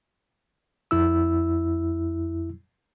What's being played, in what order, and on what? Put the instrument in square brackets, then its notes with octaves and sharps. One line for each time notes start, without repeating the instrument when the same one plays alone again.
[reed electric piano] F2 E4 E6